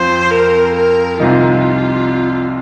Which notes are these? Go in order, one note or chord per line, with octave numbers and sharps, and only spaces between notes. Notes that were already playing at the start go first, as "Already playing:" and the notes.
Already playing: F2 F3 C4 C5
A#4
A#4
C2 C3 F3 D#4 F4